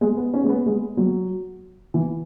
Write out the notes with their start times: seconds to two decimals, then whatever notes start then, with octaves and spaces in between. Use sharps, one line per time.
0.01 G#3
0.17 B3
0.34 C#4
0.44 G#3
0.49 B3
0.66 G#3
0.97 F#3
1.94 E3